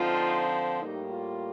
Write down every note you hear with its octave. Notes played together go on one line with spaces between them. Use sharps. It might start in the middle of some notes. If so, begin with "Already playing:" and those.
Already playing: D3 F3 C4 D#4 F4
A2 G3 A#3 D#4
F4